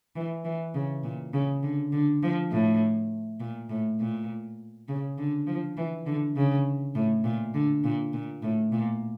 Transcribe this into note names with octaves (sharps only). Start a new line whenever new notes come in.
E3
E3
C#3
A#2
C#3
D3
D3
F3
A2
A#2
A2
A#2
C#3
D3
F3
E3
D3
C#3
A2
A#2
D3
A#2
A#2
A2
A#2